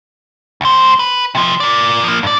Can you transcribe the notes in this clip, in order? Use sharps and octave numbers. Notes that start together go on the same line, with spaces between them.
C#2 C5
B4
C3 F3
A#4 D5
F3 A#3
G2 D5